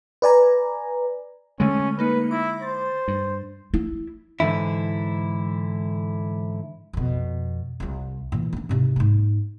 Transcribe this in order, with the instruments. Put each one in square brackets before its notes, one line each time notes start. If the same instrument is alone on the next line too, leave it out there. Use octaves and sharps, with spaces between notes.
[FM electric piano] B4 D5 G#5 A#5
[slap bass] D3 G#3 [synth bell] A3 D#7 [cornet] C#4
[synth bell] A#3 D#4 C#7 [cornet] B4
[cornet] E4 [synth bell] D6 A#6
[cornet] C5 [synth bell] A6
[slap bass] G2
[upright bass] E4
[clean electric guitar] G#2 D3 E3 E4
[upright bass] F2 B2
C2 F4
A#2 E3
A#3 D4
G#2 C3
G#2 A#3